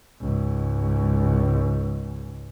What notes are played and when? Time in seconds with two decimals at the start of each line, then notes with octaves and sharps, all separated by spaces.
0.21 C#2 G#2